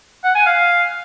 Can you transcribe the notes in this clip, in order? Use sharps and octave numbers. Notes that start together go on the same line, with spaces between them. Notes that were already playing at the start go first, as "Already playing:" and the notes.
F#5
G#5
F5